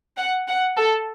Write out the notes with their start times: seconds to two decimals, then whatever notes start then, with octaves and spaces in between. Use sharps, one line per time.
0.17 F#5
0.48 F#5
0.77 A4